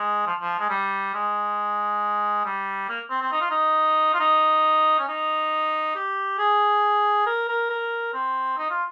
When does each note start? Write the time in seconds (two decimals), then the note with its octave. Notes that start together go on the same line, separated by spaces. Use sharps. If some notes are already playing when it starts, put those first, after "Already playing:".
Already playing: G#3
0.26 F3
0.40 F3
0.59 G#3
0.69 G3
1.14 G#3
2.45 G3
2.89 A#3
3.10 C4
3.22 C4
3.32 D#4
3.41 F4
3.50 D#4
4.14 F4
4.20 D#4
4.99 C#4
5.08 D#4
5.95 G4
6.38 G#4
7.26 A#4
7.48 A#4
7.70 A#4
8.13 C4
8.58 D#4
8.70 F4